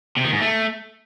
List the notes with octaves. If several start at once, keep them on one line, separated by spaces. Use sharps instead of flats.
C3
D#3
G#2
A3